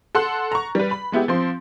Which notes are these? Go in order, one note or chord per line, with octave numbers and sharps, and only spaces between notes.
A4 F#5 C6 F#6
A#5 C#6
G3 B4
B5
G#3 B3 E4 G4
F3 C4 C6